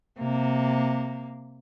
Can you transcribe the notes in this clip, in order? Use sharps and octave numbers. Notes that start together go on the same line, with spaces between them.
C3 A#3